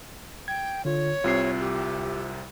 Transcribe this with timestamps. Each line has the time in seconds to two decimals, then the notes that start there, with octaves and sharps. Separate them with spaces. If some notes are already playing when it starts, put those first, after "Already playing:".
0.48 G5 G#6
0.85 D3 F4 C#5
1.24 C2 C3 F4 C7
1.60 G4